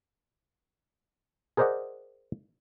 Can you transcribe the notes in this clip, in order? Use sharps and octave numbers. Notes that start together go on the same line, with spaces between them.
G#4 A#4 C5 D5 D#5 F#5